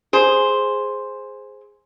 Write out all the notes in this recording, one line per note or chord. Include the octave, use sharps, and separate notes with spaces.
G#4 C5